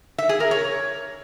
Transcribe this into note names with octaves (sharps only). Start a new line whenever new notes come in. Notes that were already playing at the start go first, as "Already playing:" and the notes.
E5
G#4
A#4
C#5